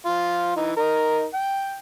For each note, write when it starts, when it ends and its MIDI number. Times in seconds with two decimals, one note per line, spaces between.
0.05 0.53 53
0.05 0.53 65
0.56 0.72 52
0.56 0.72 63
0.77 1.25 63
0.77 1.25 70
1.34 1.78 79